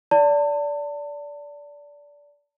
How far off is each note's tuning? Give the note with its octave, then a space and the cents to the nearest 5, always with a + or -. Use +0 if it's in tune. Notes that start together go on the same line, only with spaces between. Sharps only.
D5 -20 A5 +35